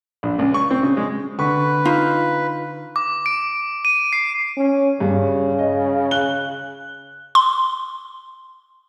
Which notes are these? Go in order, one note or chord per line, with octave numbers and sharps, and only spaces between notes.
A#1
C#2
C#6
C4
C#3
G#3
D3 B4 C#6
D#4 F4
D6
D7
D#7
C7
C#4
G2 C#3
D#5
F#6 G7
C6